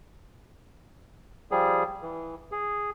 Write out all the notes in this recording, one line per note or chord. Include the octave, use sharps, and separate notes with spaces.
F3 G3 G#4
E3
G#4